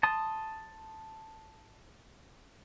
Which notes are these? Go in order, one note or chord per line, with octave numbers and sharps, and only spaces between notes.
A5 C6 D#6